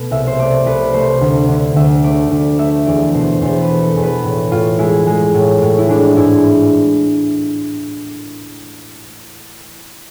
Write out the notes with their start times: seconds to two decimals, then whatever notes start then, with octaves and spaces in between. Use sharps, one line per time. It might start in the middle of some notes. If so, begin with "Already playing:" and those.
Already playing: B2 A3 A4
0.11 C2 E5
0.27 C5
0.39 A3 D5
0.66 C2 B4
0.93 A3 C5
1.21 D2
1.49 D3
1.76 D2 E5
2.04 A3 D5
2.31 D2
2.58 A3 E5
2.87 E2 D5
3.14 B2 C5
3.41 E2 C5
3.61 B4
3.69 A3
3.83 A4
3.96 E2
4.03 B4
4.23 A2
4.52 A2 F4
4.79 G#3 E4
5.07 G#3
5.34 A2
5.62 A2
5.78 E4
5.89 G#3 D4
6.16 G#2 E4